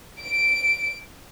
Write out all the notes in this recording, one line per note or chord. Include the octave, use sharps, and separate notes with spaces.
D7